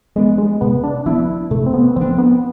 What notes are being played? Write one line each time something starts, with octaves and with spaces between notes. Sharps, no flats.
F3 G#3 B3 D4
G#3
C3 B3
D4
F3 B3 D4 E4
C3 A3
C4
B3
F3 B3 C4 D4
B3